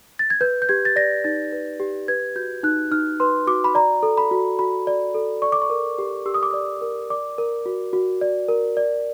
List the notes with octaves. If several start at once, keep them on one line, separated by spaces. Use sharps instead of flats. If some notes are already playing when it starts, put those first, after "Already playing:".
A6
G#6
B4 G6
G6
G4 G#6
A6
D5 A#6
D#4 A6
B4
G4
B4 G#6
F#4 G6
D#4 F#6
D#4 F6
B4 C6
F#4 D6
B5
D5 A#5
A4
B5
F#4
F#4 B5
D5
A4
D5 C#6
D6
C#6
A#4
G4
G4 E6
D#6
D6
D5 D#6
A#4
D5 D6
A#4
F#4
F#4
D5
A#4
D5